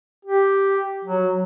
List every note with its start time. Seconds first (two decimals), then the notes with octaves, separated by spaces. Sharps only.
0.25 G4
1.04 F#3